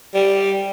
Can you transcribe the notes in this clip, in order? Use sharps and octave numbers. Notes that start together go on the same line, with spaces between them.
G3